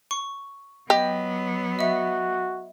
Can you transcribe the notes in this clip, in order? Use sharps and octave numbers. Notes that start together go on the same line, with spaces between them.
C#6
F#3 B3 G4 D#5
F#4 D#5 E5